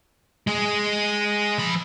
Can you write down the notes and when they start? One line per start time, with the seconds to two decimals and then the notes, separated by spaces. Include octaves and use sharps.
0.47 G#3 G#4
1.58 F3 B5